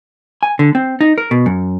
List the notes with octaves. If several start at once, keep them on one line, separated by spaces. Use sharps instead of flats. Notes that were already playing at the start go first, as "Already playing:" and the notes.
G#5
D3
C4
D#4
A#4
B2
F#2